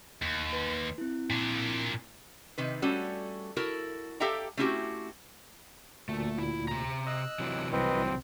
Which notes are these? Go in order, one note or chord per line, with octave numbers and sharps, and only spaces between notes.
D#2
B4 C6
C4 E4
A#2 D4
C3 D#3 B4
G3 A3 C#4 F#4 A4
E4 F#4 A4 A#4
G4 A4 E5 F5 G5 A#5
A3 C4 C#4 E4 F#4 G4
D2 A#2 A3
E4
C3 A#5
D#5 E6 F#6
C3 E3 F#3
C2 C4 B4 D#5